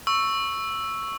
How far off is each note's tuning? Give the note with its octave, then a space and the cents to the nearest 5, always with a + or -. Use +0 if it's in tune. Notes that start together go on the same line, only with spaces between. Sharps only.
C#6 +0 E6 +0